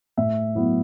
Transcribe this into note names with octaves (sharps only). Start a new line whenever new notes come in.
A2 E5
F#3 B3 E4